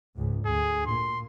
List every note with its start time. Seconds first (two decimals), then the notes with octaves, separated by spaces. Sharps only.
0.17 C#2 G#2
0.46 D2 G#4
0.86 A#2 C6